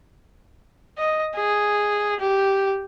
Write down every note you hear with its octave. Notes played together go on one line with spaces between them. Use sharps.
D#5
G#4
G4